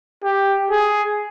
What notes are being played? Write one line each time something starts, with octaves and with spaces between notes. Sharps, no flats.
G4
G#4